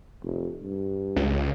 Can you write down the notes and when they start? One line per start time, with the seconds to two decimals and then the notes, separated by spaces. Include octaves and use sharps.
0.22 F1
0.62 G2
1.16 C#2